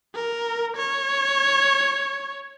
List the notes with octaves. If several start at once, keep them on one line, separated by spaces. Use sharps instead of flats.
A#4
C#5